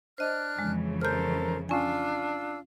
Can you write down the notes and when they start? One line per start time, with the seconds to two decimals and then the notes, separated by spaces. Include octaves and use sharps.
0.18 D4 C5 D#5 F6 F#6
0.59 F2 C#3 E3 G#3
1.01 A4 A#4 C5 F6 G6
1.69 C#4 D4 F4 G#5 E6